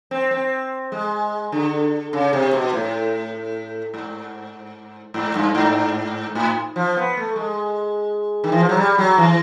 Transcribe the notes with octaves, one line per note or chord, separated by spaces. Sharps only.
C4
C4
G#3
D3
C#3
C3
B2
A2
G#2
G#2
G2
G#2
A2
F3
B3
A3
G#3
D#3
E3
F3
F#3
G3
F#3
E3